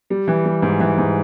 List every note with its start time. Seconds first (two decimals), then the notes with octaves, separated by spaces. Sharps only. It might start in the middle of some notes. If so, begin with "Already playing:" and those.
0.10 G3
0.28 E3
0.45 G3
0.62 G#2
0.80 E3
0.98 G#2